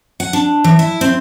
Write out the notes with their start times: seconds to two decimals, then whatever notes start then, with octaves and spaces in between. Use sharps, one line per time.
0.20 F#5
0.33 D4
0.64 E3
0.79 E4
1.01 C4